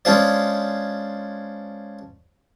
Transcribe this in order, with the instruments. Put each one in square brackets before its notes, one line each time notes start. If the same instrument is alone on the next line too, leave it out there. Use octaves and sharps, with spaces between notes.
[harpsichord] G#3 C#4 D4 F4 C5 D5